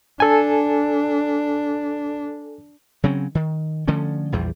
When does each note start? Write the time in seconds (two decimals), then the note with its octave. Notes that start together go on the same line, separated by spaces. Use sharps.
0.20 D4 A4 G#5
3.03 C#3 F#3 C4 C#4
3.35 D#3
3.88 D3 F3 A3 C#4
4.32 A#1 E2 G3